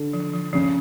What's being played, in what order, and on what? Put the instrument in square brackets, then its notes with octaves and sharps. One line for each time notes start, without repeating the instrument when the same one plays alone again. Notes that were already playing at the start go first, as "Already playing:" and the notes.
Already playing: [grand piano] D3
[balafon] F3
F3
[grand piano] C#3 [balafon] F3